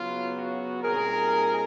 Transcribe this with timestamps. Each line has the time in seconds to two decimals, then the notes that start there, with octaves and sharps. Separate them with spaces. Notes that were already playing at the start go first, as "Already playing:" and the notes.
Already playing: C#3 F#3 B3 F4
0.37 F#4
0.83 A#2 G3 C4 D#4 G#4 A#4